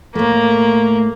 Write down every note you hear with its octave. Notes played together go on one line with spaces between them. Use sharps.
A2 A3 A#3